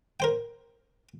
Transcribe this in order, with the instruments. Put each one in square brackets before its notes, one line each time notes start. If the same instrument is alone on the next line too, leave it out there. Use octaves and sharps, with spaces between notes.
[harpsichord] A#4 C5 G5